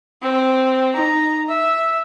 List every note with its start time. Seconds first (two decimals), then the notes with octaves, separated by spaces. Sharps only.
0.22 C4
0.93 D#4 A#5
1.48 E5